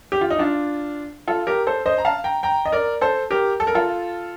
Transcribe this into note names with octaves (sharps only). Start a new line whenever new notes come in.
G4
F4
D#4
D4 F4
F4 A4
G4 A#4
A4 C5
C5 D#5
A#5
F5 A5
G5 A#5
G5 A#5
D#5
A#4 D5
A4 C5
G4 A#4
A4
A#4
F4 A4